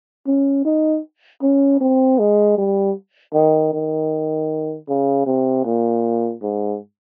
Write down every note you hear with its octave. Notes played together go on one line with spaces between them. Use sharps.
C#4
D#4
C#4
C4
G#3
G3
D#3
D#3
C#3
C3
A#2
G#2